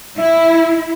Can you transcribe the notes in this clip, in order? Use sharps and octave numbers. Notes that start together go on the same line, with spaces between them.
E4 E5